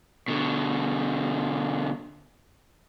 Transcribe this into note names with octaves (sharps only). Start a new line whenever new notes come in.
B2 D3